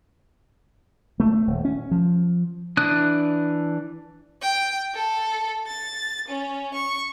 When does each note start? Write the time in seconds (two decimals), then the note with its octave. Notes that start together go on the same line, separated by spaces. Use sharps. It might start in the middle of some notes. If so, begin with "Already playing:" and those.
1.20 A3
1.47 D#1
1.65 C#4
1.91 F3
2.77 E3 D4 D#6 F#6
4.42 G5
4.94 A4
5.67 A6
6.28 C#4
6.74 C#6